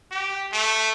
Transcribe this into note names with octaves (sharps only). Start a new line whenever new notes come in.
G4
A3